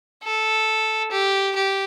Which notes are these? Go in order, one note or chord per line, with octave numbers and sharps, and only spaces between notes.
A4
G4
G4